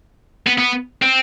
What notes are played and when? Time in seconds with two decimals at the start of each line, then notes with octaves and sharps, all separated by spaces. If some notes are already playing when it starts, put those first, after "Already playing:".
0.47 B3
0.58 B3
1.02 C4